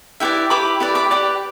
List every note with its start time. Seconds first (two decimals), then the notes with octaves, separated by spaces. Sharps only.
0.20 E4 G4 B4 D5 E5 G5
0.50 E4 G4 B4 B5 D6
0.80 E4 G4 B4 D5
0.95 B5 D6
1.11 G4 B4 D5